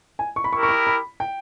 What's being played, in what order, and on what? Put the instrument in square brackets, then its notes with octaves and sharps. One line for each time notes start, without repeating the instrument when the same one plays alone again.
[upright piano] G#5
C#6
B5
[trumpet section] E4 G4 A#4 [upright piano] C#6
[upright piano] C#6
B5
B5
G5